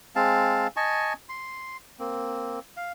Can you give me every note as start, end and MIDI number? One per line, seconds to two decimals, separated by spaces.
0.16 0.68 56
0.16 0.68 60
0.16 0.68 77
0.16 0.68 81
0.77 1.13 75
0.77 1.13 80
0.77 1.13 81
0.77 1.13 85
1.29 1.77 84
1.99 2.59 58
1.99 2.59 60
2.77 2.92 77